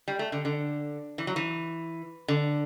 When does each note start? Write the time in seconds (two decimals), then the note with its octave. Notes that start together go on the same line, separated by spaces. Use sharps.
0.08 G3
0.19 A3
0.32 D3
0.45 D3
1.18 E3
1.27 F#3
1.36 E3
2.28 D3